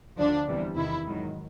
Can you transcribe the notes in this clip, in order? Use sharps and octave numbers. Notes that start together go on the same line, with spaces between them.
D2 D3 F3 D4
E2 C3 E3 G3
E2 C3 D#3 E4
G#2 D#3 F#3